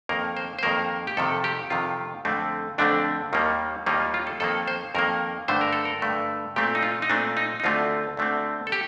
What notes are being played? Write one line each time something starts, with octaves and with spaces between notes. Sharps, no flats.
F2 D#3 A#3 A#4
C5
C5
F2 D#3 A#3 A#4
G4
F2 C3 D#3 A4
G4
F2 C3 D#3 F4
F2 D3 A3 C4
F2 D3 A3 C4 D4
D#2 D#3 G3 A#3
D#2 D#3 G3 A#3 D#4
F4
F4
A4
F2 D#3 A#3 A4
C5
F2 D#3 A#3 A#4
G2 D3 A3 C5
A#4
A4
A#4
G2 D3 A3
A#2 A3 C4 G4
D#4
F4
D#4
A#2 A3 C4 D4
D#4
D#4
D2 D3 A3 C4 F4
D2 D3 A3 C4
A4
G4